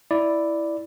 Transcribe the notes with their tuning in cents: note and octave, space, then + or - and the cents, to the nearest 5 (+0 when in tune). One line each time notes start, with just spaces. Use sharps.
E4 +0 D5 +0